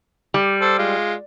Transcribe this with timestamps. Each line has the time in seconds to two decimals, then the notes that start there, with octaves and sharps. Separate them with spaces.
0.34 G3
0.61 A4 C5
0.79 G#3 F4